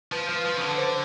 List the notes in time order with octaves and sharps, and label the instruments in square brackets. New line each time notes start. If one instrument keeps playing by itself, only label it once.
[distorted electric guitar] F3 [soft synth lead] B4
[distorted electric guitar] F3
F3
C#3
D3
[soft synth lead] C5